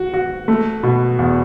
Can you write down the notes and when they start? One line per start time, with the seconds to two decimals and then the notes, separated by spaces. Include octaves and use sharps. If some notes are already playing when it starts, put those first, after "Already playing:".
Already playing: F#4
0.14 F#4
0.48 A3
0.83 B2
1.19 E2